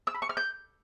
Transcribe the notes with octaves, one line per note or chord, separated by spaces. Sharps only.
E6
B5
C#6
F6
G6